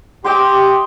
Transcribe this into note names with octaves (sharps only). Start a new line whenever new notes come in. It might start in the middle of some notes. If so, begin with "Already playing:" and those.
G4 D#5 G5 C6